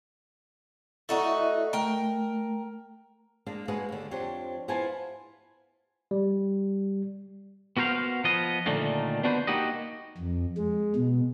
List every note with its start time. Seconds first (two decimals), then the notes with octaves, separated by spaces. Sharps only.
1.09 A3 D#4 E4 F#4 D5 E5
1.73 A3 A#4 G5
3.46 G#3 A#3 D4
3.68 G#3 A#3 F#4 G#4 B4 D#5
3.89 D#2 D3
4.11 F2 D4 G4 C5 C#5
4.68 B3 E4 F4 C5 G#5 A5
6.11 G3
7.77 B3 F#4 A#4 C5 F5
8.24 F3 B3 D#5
8.66 A#2 D3 D#3 A3 A#3
9.23 B3 D4 F#4 B4 C5
9.47 A#3 D#4 F#4 G4 D#5
10.18 F2
10.58 G#3
10.96 B2